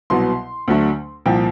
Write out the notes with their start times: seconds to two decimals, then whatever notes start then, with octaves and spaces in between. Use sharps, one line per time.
0.10 C2 B2 F#3 B3 C6
0.68 D2 D3 F#3 A3
1.26 C2 A#2 F3 G5